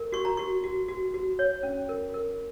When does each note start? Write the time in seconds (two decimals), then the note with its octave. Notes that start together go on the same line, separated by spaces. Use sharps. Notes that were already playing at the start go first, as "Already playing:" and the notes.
Already playing: A#4
0.12 F#4 C#6
0.25 A#5
0.37 F#4 C#6
0.64 F#4
0.88 F#4
1.14 F#4
1.39 C#5
1.63 C#4
1.89 A#4
2.14 A#4